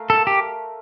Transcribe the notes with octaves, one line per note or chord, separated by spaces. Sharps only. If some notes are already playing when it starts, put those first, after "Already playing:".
Already playing: A3 A#4 F5
A4
G4